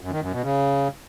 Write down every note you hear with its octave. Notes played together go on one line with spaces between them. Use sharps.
F#2
D#3
F#2
B2
C#3